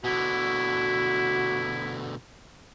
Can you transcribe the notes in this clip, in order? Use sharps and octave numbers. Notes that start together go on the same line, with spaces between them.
B2 D3 E4 F#4